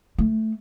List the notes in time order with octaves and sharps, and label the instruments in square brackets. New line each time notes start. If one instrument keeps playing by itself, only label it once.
[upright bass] A3